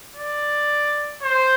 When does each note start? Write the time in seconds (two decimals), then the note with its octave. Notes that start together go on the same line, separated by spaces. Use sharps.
0.16 D5
1.22 C5